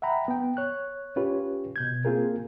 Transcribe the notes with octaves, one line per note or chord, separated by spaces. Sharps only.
E5 F#5 G5 A#5 B5
B3 G5
C#5 F#6
C#4 F4 G4 B4 C#5
B2 G6 G#6
A#3 C4 F4 G#4 A#4